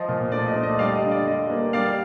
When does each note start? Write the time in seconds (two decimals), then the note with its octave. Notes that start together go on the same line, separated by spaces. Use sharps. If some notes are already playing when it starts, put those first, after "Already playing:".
Already playing: F3 D#5
0.09 A#2
0.32 A3 D5
0.48 D#5
0.56 A3
0.63 D#5
0.79 G3 D5 F5
0.95 D#5
1.02 D3
1.11 D5
1.27 G3 D#5
1.50 A#3
1.73 G3 D5 F5